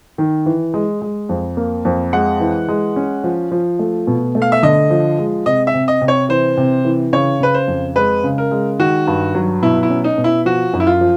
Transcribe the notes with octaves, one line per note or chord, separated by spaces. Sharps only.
D#3
E3
G#3
G#3
F2
A#3
F2
G#3 F#5
E3
G#3
C#4
F3
F3
A3
B2
A3
F5
E5
D3 D#5
F3
G#3
C3 D#5
E5
C3
D#5
C3
C#5
E3 C5
C3
E3
C#3 C#5
C#3 B4
C5
F2
G#3 B4
C#3
A#4
G#3
D#3 F#4
G2
F#3
B2 E4
E4
C#4
D#4
B2
E4
F3 F#4
F#2
E4
F4
F3